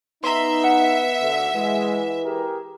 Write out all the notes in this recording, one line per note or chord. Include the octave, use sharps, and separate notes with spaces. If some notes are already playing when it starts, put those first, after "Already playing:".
B3 D#4 E5 A#5 C6
F#5
D2
E3 G#3
G4 G#4 A#4